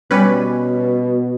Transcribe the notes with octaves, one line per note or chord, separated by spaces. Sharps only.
B2 G3 C#4 B4